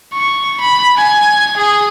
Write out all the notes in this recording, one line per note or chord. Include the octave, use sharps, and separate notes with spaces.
C#6
B5
G#5
G#4